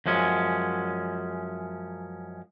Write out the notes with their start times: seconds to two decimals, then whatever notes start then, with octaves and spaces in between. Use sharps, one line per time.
0.06 F#2 F3 G#3 C#4